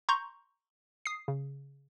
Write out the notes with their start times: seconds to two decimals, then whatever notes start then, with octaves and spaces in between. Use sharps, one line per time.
0.09 A#5 C6 C#6 G6
1.06 D#6 C7
1.28 C#3